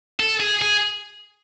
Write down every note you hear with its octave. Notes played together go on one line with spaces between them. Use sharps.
A4
G#4
G#4